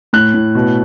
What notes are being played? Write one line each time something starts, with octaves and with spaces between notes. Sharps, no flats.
A2 F#6
A2
B2